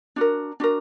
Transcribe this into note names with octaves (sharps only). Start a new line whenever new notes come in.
D4 F#4 A#4
D4 F#4 A#4